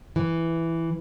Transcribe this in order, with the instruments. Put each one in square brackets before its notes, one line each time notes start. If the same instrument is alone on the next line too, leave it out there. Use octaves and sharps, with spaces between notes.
[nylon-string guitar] E3